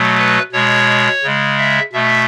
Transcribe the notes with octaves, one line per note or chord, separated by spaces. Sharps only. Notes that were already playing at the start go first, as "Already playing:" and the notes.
Already playing: B2 F#3 A3
B4
B2 G#3 C#5
C#3 G#3
E5
B2 A3 E5